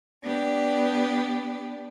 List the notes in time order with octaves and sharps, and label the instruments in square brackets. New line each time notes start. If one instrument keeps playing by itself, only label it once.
[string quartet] B3 D4 G4